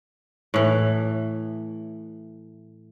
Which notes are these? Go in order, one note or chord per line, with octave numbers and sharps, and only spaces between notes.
A2 E3